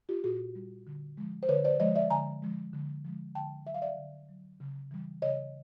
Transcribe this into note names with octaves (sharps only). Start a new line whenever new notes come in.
F4 G4
A#2 F#4 G#4
G3
D3
F3 G#3
C5
D3 B4 C#5
C5 D5
F3 G#3 C#5 D#5
D5 E5
D3 G#5 A#5
F3 G#3
D3
F3 G#3
D3 G5 A5
F#3 E5
F5
D5 E5
D3
F#3
C#3
E3 G3
C#3 C#5 D#5